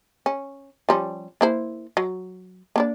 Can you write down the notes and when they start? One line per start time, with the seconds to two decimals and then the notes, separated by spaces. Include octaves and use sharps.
0.26 C#4
0.89 F3 G3 C#4
1.41 A#3 E4 C5
1.97 F#3
2.76 A#3 D4 D5